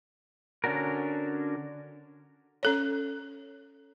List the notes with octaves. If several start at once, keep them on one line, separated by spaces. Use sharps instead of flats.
D3 C#4 D4 F#4 A#4
C#4 A4 C#5